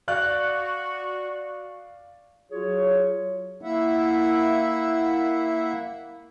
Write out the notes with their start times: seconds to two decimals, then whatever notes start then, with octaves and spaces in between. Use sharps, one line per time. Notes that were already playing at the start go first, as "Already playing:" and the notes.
0.08 F#4 D5 F5 F#6
2.51 F#3 F4 F#4 G#4 C#5
3.62 A#3 E4 E5 F#5